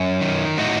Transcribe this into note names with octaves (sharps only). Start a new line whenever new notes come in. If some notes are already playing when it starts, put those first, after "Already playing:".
Already playing: F#2
D#3
A2 D#4 F#4